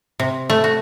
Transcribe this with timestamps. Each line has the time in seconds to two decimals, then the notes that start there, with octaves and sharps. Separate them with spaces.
0.20 C3
0.50 A3
0.64 F#4